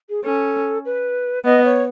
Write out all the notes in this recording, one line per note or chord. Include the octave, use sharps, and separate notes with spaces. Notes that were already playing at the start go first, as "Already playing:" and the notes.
G#4
C#4 A4
B4
B3 D#5
C#5